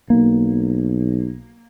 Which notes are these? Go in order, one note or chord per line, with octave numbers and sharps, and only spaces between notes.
B1 A#3